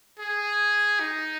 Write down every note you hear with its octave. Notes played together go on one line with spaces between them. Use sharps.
G#4
D#4